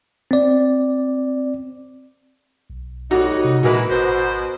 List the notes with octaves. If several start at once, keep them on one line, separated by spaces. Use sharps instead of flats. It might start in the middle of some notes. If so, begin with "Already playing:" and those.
C4 D5
B1
A2 G3 D#4 F#4
C3
A#2 E3 G#3 F#4 A#4 B4
G#1 B2 C5